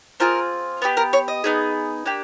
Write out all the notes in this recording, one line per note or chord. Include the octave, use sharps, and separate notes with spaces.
C4 F4 G#4 A#4
B3 D#4 G4
A#4
C#5
D#5
B3 D#4 G#4
A#3 D4 G4